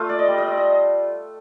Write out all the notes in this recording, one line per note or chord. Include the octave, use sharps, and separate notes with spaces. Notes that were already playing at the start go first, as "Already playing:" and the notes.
Already playing: A3 F4
D5
D#5
G3 D5
D#5
D5
D#5